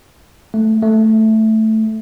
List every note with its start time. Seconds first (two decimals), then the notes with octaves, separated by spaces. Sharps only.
0.54 A3
0.82 A3